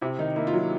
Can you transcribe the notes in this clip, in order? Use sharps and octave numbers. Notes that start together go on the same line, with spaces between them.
C3 E4
D#3 D#4
A#3 E4
F4
F#3